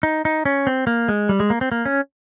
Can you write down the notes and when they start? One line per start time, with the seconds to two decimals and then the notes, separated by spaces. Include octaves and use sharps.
0.03 D#4
0.25 D#4
0.45 C#4
0.67 C4
0.87 A#3
1.08 G#3
1.29 G3
1.40 G#3
1.50 A#3
1.61 C4
1.72 A#3
1.85 C#4